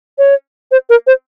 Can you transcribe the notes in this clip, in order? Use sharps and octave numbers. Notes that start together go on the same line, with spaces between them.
C#5
C5
A#4
C5